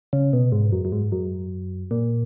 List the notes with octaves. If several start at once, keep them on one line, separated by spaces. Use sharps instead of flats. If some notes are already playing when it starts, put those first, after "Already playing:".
C#3
B2
G#2
F#2
F#2
G#2
F#2
A#2